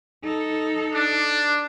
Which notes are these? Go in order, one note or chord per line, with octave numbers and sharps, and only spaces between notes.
D#4 A4
D4